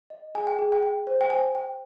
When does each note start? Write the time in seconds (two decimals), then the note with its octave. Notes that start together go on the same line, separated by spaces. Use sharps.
0.10 D#5
0.35 G#4 G#5
0.47 G5
0.59 G#4
0.72 G5
0.83 G5
1.07 C5
1.21 G5
1.30 C5 G#5
1.55 G5